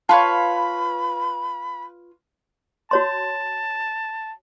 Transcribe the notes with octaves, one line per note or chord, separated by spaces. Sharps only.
F4 B4 C#5 A5 B5
F#4 C#5 A5 C6